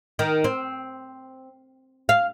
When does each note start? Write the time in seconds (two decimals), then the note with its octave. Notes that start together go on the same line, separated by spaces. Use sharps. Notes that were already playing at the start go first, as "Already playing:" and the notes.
0.19 D#3
0.44 C4
2.09 F5